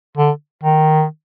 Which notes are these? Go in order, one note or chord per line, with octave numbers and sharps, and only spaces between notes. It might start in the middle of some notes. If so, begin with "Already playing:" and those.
D3
D#3